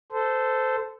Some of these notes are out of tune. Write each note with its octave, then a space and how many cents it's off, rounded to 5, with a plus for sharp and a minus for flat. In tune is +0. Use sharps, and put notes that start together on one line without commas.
A4 +0 C5 -20